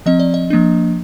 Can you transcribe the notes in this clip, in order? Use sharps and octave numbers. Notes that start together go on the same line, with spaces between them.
F3 C4 D#5
D5
D#5
F3 A#3 D4